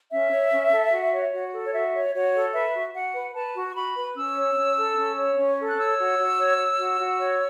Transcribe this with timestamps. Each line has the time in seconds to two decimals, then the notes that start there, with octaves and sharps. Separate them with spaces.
0.11 C#4 E5
0.31 C#5
0.51 C#4
0.72 A4
0.92 F#4
1.13 C#5
1.33 F#4
1.53 A4
1.66 C#5
1.73 F#4 E5
1.93 C#5
2.13 F#4 C#5
2.34 A4
2.54 B4 E5
2.74 F#4
2.94 F#4 F#5
3.15 B4
3.35 B4 A5
3.55 F#4
3.69 C#6
3.75 F#4 B5
3.96 B4
4.16 C#4 E6
4.36 C#5
4.56 C#4
4.76 A4
4.97 C#4
5.17 C#5
5.37 C#4
5.57 A4
5.67 F#6
5.78 C#5 E6
5.98 F#4
6.18 F#4
6.39 C#5
6.58 C#5
6.79 F#4
7.00 F#4
7.20 C#5